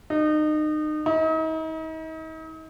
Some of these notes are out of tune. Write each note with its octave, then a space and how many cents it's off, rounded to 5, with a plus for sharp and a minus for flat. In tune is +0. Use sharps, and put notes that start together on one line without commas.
D#4 -30
D#4 +40